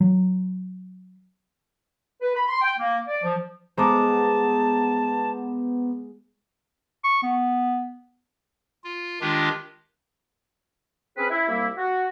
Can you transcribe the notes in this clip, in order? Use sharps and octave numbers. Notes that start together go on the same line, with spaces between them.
F#3
B4
B5
C6
G5
A#3
D5
F3
G#3 B3 C5 A5 A#5 D6
C#6
B3
F4
D#3 G#3 D4 F4 G4
C4 C#4 G#4 B4
E4
C2 G3 A#3 E4
F#4